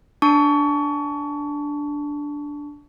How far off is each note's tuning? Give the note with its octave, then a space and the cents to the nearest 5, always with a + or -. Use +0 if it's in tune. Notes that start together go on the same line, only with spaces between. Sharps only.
D4 -5 A5 +0 C#6 +30